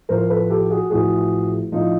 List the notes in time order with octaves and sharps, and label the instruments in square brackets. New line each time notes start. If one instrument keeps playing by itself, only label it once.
[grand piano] A1 A2 F3 A#4 C5
A4 B4
G4 A4
F#4 G#4
A1 A2 F3 F#4 G#4
A2 F3 D#4 F4